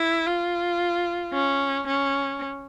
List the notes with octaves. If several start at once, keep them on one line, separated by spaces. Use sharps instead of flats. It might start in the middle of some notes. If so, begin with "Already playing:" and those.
Already playing: E4
F4
C#4
C#4